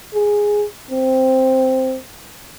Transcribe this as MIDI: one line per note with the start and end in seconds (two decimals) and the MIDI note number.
0.14 0.65 68
0.90 1.96 60